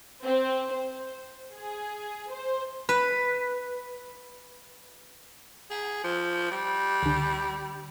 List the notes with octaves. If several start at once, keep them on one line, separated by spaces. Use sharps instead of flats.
C4
C5
G#4
C5
B4 B5
G#4
F3
G3
C#2 D3